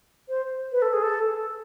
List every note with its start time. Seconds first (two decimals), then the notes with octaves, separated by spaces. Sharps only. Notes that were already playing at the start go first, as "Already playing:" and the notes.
0.29 C5
0.72 B4
0.82 A4
0.93 G#4
1.03 A4